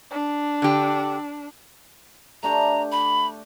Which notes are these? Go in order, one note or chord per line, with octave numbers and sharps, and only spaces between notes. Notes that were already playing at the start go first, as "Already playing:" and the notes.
D4
D3 G4
A3 D4 G4 A#5
B5